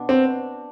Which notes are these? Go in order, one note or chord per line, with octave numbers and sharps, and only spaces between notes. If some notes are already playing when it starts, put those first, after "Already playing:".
Already playing: B2 D4
C4